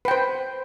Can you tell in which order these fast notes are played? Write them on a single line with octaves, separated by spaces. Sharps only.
B4 G5 C5